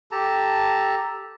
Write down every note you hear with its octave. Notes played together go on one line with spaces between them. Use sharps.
G4 A4 A5 A#5